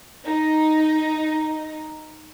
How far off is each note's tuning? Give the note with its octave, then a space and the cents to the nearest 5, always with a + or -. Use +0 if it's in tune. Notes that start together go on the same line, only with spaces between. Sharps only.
D#4 +0